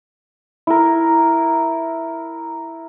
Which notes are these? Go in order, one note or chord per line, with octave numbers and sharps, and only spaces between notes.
E4 A#4